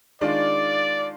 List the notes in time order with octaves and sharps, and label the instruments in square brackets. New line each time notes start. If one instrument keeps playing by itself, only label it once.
[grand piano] D#3 G#3 D4 F4 [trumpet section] D5